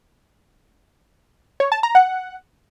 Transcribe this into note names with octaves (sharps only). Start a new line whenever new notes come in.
C#5
A5
A#5
F#5